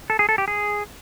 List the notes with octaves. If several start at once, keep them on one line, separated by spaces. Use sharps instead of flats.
A4
G#4
A4
G4
G#4